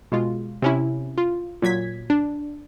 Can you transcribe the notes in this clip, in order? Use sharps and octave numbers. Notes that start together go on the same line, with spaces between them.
B2 G#3 F4
C3 C#4 E4
F4
A#2 F#3 G#6 B6
D4